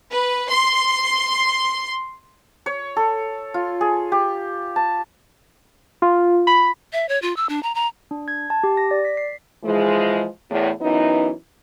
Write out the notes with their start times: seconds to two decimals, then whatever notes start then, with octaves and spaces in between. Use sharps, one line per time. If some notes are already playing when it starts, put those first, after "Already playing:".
0.11 B4
0.49 C6
2.66 C#5
2.96 A4
3.54 F4
3.81 G#4
4.12 G4
4.76 A5
6.02 F4
6.47 B5
6.93 E5
7.09 C#5
7.22 F4
7.37 E6
7.49 D4
7.63 A#5
7.75 A#5
8.11 D4
8.28 G#6
8.50 A5
8.64 G4
8.77 A#6
8.91 D5
9.05 B6
9.17 C7
9.63 E3 F3 G#3
10.51 E2 A2
10.81 F#2 E3 B3 D#4